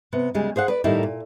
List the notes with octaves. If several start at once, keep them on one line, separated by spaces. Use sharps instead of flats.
C3 B3
D2 C#3 G3 G#3 G#4 G#5
G#4 C5 F5 F#5
B4 D5
A2 D#3 G3 A3 A#3 E4
A#2